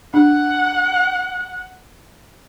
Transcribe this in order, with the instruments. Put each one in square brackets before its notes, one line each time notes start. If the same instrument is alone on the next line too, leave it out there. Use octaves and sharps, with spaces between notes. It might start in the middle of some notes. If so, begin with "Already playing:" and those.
[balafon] D4 [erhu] F#5